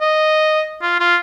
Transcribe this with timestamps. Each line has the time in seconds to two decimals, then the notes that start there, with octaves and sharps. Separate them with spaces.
0.01 D#5
0.82 F4
0.99 F4